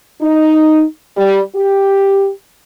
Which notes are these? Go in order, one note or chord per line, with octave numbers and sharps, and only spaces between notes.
D#4
G3
G4